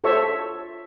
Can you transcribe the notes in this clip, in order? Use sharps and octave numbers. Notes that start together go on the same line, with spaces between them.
F4 A4 C5 C#5 E5 C#6